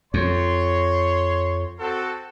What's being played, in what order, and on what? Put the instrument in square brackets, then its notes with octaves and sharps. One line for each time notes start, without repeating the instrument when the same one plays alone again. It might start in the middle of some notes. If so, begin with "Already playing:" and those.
[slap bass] F2 [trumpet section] C#5 C6
[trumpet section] C4 F#4 A4